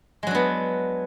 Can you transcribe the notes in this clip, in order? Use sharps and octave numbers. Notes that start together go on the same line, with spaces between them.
F#3 G#3 B3 D4